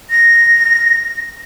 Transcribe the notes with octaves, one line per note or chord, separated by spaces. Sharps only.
A#6